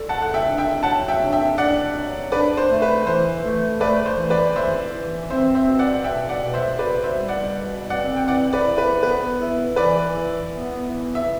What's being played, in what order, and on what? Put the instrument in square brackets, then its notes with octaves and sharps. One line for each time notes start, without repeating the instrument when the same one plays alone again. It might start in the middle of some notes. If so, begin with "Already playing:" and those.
Already playing: [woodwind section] A4 [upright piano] D5
[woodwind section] A3 [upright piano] F#5 A5
[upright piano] F#5
E5 G5
[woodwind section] D4
[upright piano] E5 G5
[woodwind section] F#3 [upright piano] F#5 A5
[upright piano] E5 G5
[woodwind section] D4
[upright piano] E5 G5
[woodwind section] D4 [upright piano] D5 F#5
[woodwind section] F#3
[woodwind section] D4 [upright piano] B4 D5
[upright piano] C5
[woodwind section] A3
[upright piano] B4
[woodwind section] E3 [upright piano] C5
[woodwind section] A3
[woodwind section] A3 [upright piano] B4 D5
[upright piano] C5
[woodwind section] E3
[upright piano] B4 D5
[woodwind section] E3 [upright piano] C5 E5
[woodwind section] E3
[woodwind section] C4 [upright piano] C5 E5
[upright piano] C5 E5
[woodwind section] B2
[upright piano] D5 F#5
F#5
[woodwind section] B2 [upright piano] E5 G5
[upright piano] D5 F#5
[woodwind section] B2
[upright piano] C5 E5
[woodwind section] B2 [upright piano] B4 D5
[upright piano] C5 E5
[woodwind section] G3
[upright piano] D5 F#5
[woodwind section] B2
[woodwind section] C4 [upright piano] D5 F#5
[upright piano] G5
[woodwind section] E3 [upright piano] D5 F#5
[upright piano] B4 D5
[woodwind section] E3
[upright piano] B4
[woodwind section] B3 [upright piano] B4
[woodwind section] E4
[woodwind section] E3 [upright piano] B4 D5
[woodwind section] E4
B3
E3
[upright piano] E5